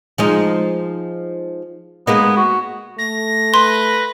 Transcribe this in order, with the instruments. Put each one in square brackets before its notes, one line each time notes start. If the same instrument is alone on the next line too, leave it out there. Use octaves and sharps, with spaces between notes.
[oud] F3 G#3 D#4
[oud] G#3 A#3 D#4 [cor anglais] B3
[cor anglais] F#4
[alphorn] A3 [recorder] A#6
[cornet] B4 [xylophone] C6